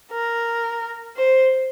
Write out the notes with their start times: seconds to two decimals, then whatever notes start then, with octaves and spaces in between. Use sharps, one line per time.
0.12 A#4
1.17 C5